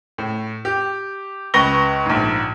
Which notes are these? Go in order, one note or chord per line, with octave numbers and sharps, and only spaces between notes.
A2
G4
C#2 B4 C#6 A#6 G7
A#1 G#2